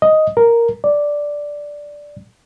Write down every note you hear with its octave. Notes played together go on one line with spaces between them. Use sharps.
D#5
A#4
D5